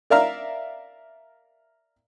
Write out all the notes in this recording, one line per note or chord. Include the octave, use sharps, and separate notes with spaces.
A#4 D5 E5 F5 A#5 F6